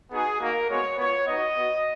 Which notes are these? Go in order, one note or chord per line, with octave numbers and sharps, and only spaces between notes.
B3 D#4 F#4 G#4
A#3 D#4 F#4 A#4
G#3 B3 F#4 C#5
B3 F4 C#5
B3 D#4 F#4 D#5
B3 F#4